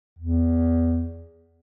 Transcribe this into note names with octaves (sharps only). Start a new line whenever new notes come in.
E2